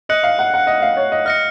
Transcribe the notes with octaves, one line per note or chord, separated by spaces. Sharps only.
D#5 F#6 C#7 F#7
F5
F#5
F#5
D#5
F5
C#5
D#5
D#5 F6 A#6 C#7